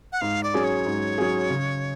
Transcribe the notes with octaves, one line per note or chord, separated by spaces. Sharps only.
F#5
G#2 F5
D5
F#3 C#4 G#4
C#5
G#2
F#3 C#4 G#4
C#3